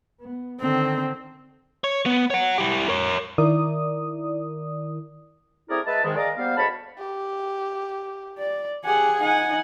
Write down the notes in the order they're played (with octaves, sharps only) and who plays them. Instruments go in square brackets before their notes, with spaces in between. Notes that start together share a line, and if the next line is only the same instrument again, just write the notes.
[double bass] B3
[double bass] D3 D#3 [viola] C4
[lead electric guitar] C#5
B3
C#5 F#5
E4 G4
A#4 C#5
[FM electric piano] D#3 E4 A#4 D5 D#6
[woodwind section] A3 C4 E4 G#4 A#4 D5
G#3 B4 E5 A5
G#2 D#3 G#3
G#4 A#4 D5 D#5 F5 A#5
G3 A#3 B3 C5 F5
D2 G#3 C#5 A5 B5
[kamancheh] G4
[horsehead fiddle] D5
[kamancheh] G4 G#4 [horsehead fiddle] F#5 G#5
[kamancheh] D#4 [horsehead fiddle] F#5 G#5